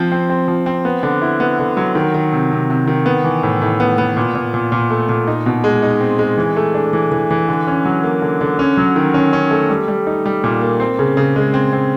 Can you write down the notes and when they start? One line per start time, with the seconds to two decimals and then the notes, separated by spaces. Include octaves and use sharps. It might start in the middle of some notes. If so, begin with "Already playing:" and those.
Already playing: F3 C4
0.12 C4
0.30 C4
0.48 F3
0.66 C4
0.85 B3
1.03 D3
1.22 E4
1.40 B3
1.59 D3
1.77 F#3
1.95 D#3
2.14 D#3
2.33 C3
2.52 C3
2.70 C3
2.87 D#3
3.06 B3
3.24 E3
3.43 A2
3.62 A2
3.80 B3
3.98 B3
4.17 A#2
4.35 A#2
4.54 A#2
4.72 A#2
4.90 A3
5.09 A#2
5.27 D#4
5.46 B2
5.64 G#3
5.82 D#4
6.01 C4
6.19 G#3
6.38 E3
6.56 A3
6.74 D4
6.93 E3
7.12 E3
7.31 E3
7.49 D3
7.67 C#4
7.85 F#3
8.04 A#3
8.22 D3
8.41 D3
8.59 C#4
8.77 F#3
8.96 D#3
9.14 C#4
9.33 C#4
9.51 A3
9.70 G3
9.88 G3
10.07 D#4
10.26 G3
10.44 A#2
10.61 A#3
10.80 C4
10.99 C#3
11.17 C#3
11.36 G#3
11.54 C4
11.73 C4